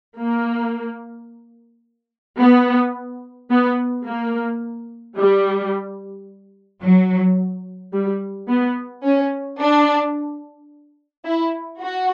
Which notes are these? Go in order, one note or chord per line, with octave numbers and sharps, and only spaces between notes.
A#3
B3
B3
A#3
G3
F#3
G3
B3
C#4
D4
E4
F#4